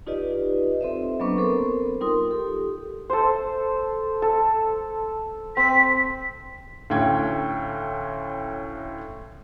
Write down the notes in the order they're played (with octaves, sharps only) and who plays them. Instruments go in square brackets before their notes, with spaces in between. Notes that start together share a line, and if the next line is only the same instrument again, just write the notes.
[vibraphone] D#4 F4 G4 B4 D5 D#5
C4 A4 C5 D#5 E5
F#3 A#3 B3 D4 B4 C#6
B3 C4 A4 A#4 C5
G3 D#4 F4 A#4 C6 D#6
G4 A4
[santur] A4 C5
A4
[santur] C4 [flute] B6
[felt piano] D2 A2 C#4 F5 G5 G#6